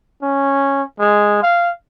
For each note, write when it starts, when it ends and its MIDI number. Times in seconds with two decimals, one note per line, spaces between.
0.22 0.82 61
1.00 1.38 56
1.43 1.70 77